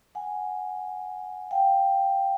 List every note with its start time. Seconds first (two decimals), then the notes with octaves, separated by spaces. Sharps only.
0.15 F#5 G#5
1.51 F5 G5